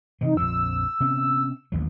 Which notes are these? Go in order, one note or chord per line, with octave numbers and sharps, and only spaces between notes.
C3 E3 F3 D#4
A#1 F2 F3 E6
C3 B3 C#4
A1 D#2 F#3